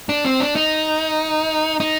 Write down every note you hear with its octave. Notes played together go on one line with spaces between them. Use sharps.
D4
C4
D4
D#4
D#4